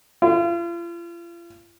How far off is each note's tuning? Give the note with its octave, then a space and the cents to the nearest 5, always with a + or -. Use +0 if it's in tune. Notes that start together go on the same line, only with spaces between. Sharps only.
F4 -40